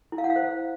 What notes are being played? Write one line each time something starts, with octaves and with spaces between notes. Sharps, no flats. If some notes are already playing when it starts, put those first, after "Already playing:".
E4
F5
F#5
F5
C5